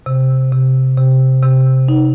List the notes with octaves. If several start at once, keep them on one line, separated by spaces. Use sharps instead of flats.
C3
C3
C3
C3
D#4